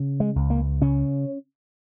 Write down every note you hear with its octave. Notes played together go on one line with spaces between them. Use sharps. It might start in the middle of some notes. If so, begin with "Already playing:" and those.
Already playing: C#3
G#3
C#2
A#3
C#3 C#4